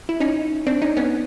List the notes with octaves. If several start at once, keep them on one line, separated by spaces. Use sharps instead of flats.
E4
C#4 D#4
C4 D4
C#4 D#4
B3 C#4